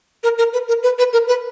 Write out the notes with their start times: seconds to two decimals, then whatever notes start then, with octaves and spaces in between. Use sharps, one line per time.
0.23 A#4
0.38 A#4
0.53 B4
0.68 A#4
0.83 B4
0.98 B4
1.13 A#4
1.28 B4